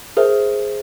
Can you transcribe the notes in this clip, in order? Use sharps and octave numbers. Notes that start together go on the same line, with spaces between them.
G#4 A#4 C5 E5